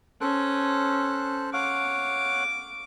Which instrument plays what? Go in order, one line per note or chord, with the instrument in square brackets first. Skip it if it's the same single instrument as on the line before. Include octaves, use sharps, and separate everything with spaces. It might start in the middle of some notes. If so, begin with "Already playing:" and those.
[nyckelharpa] C#4 [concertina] A4 C5 F#6
[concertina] C#5 F5 F#5 [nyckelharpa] D6